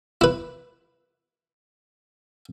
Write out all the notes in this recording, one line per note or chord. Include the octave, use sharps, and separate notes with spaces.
E4 B4